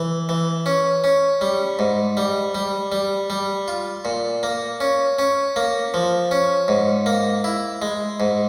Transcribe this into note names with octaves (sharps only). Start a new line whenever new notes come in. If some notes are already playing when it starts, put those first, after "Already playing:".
Already playing: E3
E3
C#4
C#4
G3
G#2
G3
G3
G3
G3
F4
A#2
A#3
C#4
C#4
A#3
F3
C#4
G#2
A#3
E4
G#3
G#2